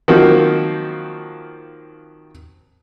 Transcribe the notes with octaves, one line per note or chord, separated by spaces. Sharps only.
D#3 F3 F#3 A#3 C4 F#4